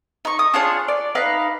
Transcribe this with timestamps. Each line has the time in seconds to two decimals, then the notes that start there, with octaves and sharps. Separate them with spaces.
0.25 D#4 C#6
0.39 D#6
0.54 D4 F4 G#4 C#5
0.88 D5
1.15 D#4 B4 F5